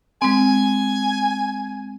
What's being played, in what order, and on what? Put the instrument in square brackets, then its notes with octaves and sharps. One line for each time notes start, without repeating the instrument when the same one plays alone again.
[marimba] G#3 C4 [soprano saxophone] G#5